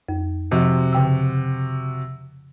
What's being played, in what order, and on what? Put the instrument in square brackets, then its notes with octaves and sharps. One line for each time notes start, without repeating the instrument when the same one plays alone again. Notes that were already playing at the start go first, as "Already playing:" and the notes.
[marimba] F2
[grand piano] C3 F#4 [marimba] F3
[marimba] C#3 G5 E6